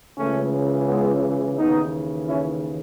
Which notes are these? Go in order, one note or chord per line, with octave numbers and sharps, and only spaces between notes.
C#2 C#3 E3 A3 C#4
G#3 B3
D#2 C#3 E3 B3 D#4
C#4 E4